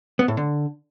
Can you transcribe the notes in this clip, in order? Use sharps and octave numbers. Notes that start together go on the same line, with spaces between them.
B3
A2
D3